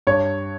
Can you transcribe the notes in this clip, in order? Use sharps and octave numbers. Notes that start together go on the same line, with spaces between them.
G2 C#5